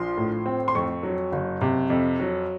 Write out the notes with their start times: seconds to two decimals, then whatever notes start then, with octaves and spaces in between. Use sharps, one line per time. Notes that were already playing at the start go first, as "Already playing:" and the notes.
Already playing: A#1 F3 C6
0.17 A2
0.46 C4
0.68 C6
0.75 F2 C#6
1.03 F#3
1.32 F#1
1.61 C3
1.90 F2
2.20 F#3